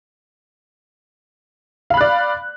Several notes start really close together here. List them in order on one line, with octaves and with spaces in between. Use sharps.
F5 B5 F#6 D5